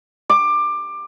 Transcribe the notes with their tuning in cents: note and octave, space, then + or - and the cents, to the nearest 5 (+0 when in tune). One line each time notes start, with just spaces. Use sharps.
D6 +20